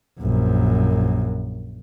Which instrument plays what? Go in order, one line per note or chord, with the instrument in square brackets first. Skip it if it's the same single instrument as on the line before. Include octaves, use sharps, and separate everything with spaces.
[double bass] A#1 F#2